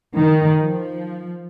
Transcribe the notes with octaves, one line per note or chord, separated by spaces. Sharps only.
D#3
F3